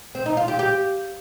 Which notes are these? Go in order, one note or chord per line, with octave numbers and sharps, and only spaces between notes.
C4
D#4
F4
G4
G4